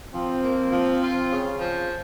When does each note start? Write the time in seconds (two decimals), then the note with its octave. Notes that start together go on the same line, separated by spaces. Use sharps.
0.12 F3 C4
0.42 A#3
0.71 F3
1.01 F4
1.31 C#3
1.59 F3